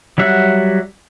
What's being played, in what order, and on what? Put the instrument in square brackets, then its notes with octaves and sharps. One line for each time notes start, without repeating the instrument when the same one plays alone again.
[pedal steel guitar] F#3 G3 E5 F#5